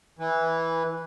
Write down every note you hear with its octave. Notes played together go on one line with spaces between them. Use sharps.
E3